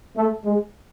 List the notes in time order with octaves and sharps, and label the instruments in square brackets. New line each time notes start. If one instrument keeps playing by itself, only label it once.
[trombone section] A3
G#3